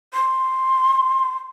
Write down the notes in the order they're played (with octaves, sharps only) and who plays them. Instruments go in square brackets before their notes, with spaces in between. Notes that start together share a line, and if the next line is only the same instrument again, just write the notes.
[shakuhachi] C6